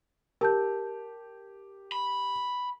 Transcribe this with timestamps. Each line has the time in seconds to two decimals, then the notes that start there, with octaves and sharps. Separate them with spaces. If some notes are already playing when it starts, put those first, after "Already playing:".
0.41 G4 A#4 A5 G6
1.92 B5